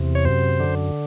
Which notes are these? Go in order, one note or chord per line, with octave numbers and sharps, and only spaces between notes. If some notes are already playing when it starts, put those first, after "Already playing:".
Already playing: E2 C3
C#5
F#2 C5
D3